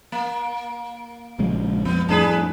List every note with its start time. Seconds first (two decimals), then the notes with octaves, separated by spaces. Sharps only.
0.12 A#3
1.39 A#1 C#3 G#3
1.85 F2 B3
2.09 F2 A2 D4 G#4 B4